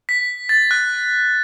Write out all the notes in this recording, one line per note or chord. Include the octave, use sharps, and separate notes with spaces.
B6
A6
F#6